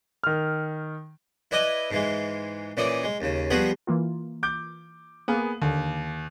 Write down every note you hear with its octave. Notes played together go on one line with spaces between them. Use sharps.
D#3 F6
E4 B4 D5 D#5 G#5
G#2 E3 G#3
A#2 E3 C#4 D5 D6 D#6
G#3
D#2 C#3
F3 G3 B3 F#4 G#4 B4
E3 A#3 F4
D6 G6
A#3 B3 G#4
D#2 D3